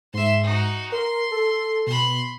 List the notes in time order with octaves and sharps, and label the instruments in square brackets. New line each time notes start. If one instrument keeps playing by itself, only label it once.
[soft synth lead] G#2 [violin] E5 C6
[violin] D#4 F#4
[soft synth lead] A#4 [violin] C6
[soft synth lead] A4
[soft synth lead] B2 [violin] B5 C6